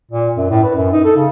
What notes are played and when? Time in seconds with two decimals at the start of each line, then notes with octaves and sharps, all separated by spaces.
0.11 A#2
0.37 F#2
0.50 A2
0.63 B4
0.75 F#2
0.93 D#4
1.04 A4
1.16 C#3